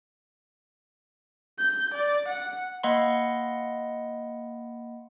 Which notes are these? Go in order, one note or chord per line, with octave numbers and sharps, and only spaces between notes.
G6
D5
F#5
A#3 D#5 F#5 B5 C6